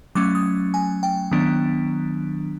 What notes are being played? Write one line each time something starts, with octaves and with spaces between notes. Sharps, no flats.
F#3 A3 C#4 D6
D#6
G#5
G5
D#3 F#3 B3 D4